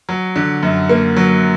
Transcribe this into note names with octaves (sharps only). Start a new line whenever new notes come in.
F#3
D3
F#2
A#3
F#3